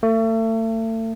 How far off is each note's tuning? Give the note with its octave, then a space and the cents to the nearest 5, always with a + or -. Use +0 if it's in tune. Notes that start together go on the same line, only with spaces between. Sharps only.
A3 +35